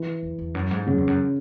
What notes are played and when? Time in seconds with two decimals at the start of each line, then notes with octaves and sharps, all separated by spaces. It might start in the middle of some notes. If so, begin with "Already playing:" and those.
Already playing: E3
0.23 E2
0.39 E2
0.55 F#2
0.71 G#2
0.87 F#2 C#3
0.98 E2
1.07 F#2